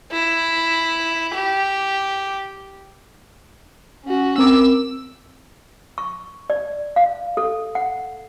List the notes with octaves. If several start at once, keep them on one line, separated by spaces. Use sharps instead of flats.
E4
G4
C#4 F#4
C4 A#4 D6 E6
C#6
D5
F5
A4
F#5